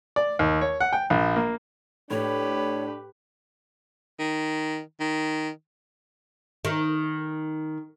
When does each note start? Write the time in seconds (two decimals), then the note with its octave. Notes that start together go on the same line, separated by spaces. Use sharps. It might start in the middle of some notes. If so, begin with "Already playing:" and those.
0.16 D5
0.39 D#2
0.61 C#5
0.80 F#5
0.93 G5
1.10 A#1
1.36 A#3
2.11 A2 D4 G4 B4 C#5
4.20 D#3
5.00 D#3
6.65 D#3